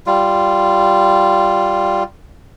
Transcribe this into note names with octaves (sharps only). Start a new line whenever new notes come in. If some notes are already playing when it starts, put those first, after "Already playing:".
G3 F4